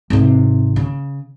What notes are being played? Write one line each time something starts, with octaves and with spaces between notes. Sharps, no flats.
G#1 C3
C#3